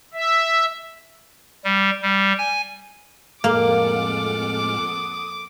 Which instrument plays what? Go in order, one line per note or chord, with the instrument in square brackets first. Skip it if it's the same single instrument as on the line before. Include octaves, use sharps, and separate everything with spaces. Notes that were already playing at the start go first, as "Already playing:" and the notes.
[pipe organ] E5
G3
G3
G#5
[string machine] F2 A4 F#5 [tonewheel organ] A2 G#3 F6 [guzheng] A#3 [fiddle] D6
[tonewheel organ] D#6